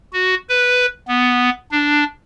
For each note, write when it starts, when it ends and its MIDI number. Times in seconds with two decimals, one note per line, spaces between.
0.13 0.35 66
0.49 0.86 71
1.08 1.49 59
1.71 2.04 62